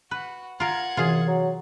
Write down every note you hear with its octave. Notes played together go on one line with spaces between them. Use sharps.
F#4 B4
F4 A#4 F#5 G#6
F#2 C3 E3 F4 G#4
F#3